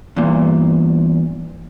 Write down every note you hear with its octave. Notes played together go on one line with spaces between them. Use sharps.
E2 G2 A#2